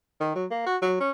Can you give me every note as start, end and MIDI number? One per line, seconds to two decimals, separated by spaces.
0.20 0.31 51
0.35 0.45 54
0.51 0.63 58
0.66 0.77 66
0.82 0.96 54
1.00 1.11 61